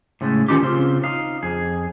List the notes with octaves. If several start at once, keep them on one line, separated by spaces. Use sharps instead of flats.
A2 C#3 G#3 A3
D#3 C#4 D#4 F4 G4
C#3 C4 F4
D#4 F5
F2 G#4